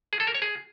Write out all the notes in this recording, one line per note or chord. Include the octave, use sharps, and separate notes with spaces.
G#4
A4
A#4
C#5
G#4